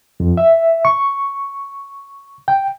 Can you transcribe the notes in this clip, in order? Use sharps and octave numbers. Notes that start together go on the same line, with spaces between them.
F2
E5
C#6
G5